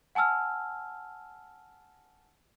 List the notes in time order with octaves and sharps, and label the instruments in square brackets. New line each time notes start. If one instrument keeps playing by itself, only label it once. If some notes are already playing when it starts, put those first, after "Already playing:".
[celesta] F#5 G#5 A5 E6 F6